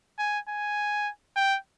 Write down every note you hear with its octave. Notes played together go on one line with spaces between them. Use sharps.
G#5
G#5
G5